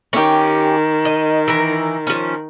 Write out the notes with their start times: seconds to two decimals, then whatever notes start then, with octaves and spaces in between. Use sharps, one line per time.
0.13 D#3 C#4 G4
1.05 D#5
1.48 E3 A#4
2.07 F3 C#4